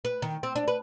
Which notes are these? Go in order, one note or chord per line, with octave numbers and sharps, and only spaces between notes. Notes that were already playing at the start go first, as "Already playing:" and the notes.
B4
D#3
C4
D4
B4